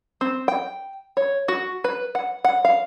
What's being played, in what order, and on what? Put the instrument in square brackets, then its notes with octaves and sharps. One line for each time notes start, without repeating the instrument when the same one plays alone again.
[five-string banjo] C4
G5
C#5
F#4
B4
F#5
F#5
F5